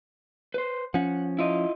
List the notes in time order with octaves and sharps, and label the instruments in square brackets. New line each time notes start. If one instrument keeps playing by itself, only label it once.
[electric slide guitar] B4 C5
[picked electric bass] F3 C#4 [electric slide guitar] F#5
[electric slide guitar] E4 F4 D#5